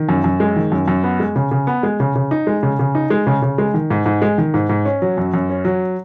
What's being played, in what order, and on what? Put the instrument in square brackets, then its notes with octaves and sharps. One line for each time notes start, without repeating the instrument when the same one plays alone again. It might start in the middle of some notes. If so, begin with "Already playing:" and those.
Already playing: [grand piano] D#3
F#2
F#2
G#3
D#3
F#2
F#2
B3
G#3
C#3
C#3
B3
G#3
C#3
C#3
D#4
G#3
C#3
C#3
D#4
G#3
C#3
C#3
G#3
D#3
G#2
G#2
G#3
D#3
G#2
G#2
C#4
F#3
F#2
F#2
C#4
F#3